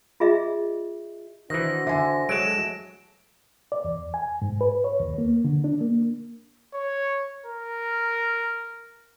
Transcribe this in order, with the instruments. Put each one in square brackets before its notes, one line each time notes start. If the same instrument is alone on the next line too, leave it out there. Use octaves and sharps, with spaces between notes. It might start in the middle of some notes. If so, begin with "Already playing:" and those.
[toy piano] F4 G#4 D#5 E5
[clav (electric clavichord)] D#3 E3 [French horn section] D4 F#4 C5 [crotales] A#6
[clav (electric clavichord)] D3 [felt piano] E5 G#5
[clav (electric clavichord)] F#3 G#3 [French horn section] A3 A4 [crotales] D7 E7
[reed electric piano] D5
E2
G#5
G#2
B4
C#5
D#2
A#3
D3
D4
A#3
[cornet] C#5
A#4